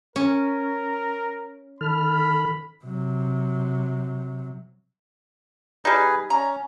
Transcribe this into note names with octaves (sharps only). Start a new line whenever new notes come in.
C#4 A#4
D#3 A4 B5 F6
C3 F#3
G3 D#4 G#4 B4
C#4 A#5